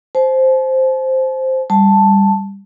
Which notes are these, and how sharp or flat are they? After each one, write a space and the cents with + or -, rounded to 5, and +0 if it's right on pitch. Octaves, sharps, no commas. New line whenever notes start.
C5 +0 A5 -40
G3 +15 A5 +0